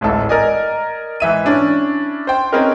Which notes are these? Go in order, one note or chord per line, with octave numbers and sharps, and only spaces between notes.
D1 A1 G#2 E4 A4
A#4 D5 D#5 G#5
G#2 E3 E5 D#7
C#4 D4 E4
C5 G5
C4 C#4 D#4 G#4 A#4 B4